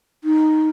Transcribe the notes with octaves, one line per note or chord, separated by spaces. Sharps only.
D#4